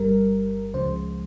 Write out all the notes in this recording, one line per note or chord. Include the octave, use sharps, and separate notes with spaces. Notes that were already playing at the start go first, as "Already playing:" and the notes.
Already playing: G1 G2 G3 A#4
C#2 C#3 F3 G#3 C5